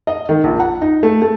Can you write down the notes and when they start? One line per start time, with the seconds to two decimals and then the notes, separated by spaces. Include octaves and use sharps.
0.07 D#5
0.29 D#3
0.44 A#1
0.60 F#5
0.81 D#4
1.03 A3
1.22 A3